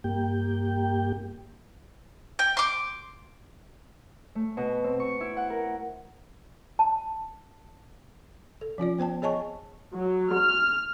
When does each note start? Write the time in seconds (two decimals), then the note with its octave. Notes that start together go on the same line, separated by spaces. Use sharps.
0.04 G2 A#3 G4 G5
2.39 G5
2.57 C6 D6
4.35 A3
4.57 B2
4.84 C4
5.00 C#6
5.20 E4
5.37 F#5
5.50 A#4
6.79 A5
8.61 A4
8.78 F3 C#4 F4 D5
8.98 B3 C5 G5 A5
9.22 G#4 C#5 D#5 G#5 A5 C#6
9.93 F#3
10.34 F6